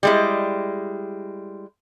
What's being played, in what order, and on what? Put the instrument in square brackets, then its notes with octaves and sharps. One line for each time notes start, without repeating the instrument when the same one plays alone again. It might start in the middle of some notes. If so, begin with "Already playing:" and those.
[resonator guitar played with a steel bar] G3 G#3 E4